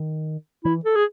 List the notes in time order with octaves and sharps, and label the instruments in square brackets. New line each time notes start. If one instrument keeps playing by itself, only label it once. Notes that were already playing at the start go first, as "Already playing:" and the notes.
Already playing: [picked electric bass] D#3
[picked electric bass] E3 [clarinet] E4
[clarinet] A4
G#4